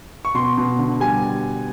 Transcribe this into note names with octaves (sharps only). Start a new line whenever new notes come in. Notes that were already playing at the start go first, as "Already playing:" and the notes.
C#6
B2 C6
B2
D3
G3 G#5